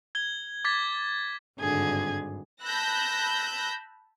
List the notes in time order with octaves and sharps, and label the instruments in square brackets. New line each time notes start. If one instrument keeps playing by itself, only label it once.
[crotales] G#6 G7
D6 G#6 A6 B6
[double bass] G#1 G2 [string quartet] D3 G#4 G#6
[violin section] A5 B5 E6 F#6 G6 A#6